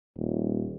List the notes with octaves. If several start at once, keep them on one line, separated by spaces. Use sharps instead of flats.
D#1